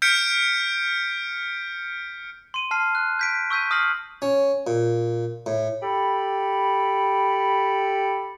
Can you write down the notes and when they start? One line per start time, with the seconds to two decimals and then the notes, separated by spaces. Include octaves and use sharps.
0.02 F6 G6 B6 C#7 D7
2.54 C6 D#7
2.71 A5 F6 C7
2.95 F#6
3.19 G6 B6 D7
3.50 C#6 E6 G6 B6 D#7
3.71 D#6 F6 A#6 C7 F#7
4.22 C#4
4.67 A#2
5.46 A2
5.82 G4 A4 B5